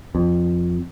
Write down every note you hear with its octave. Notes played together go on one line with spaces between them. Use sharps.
F2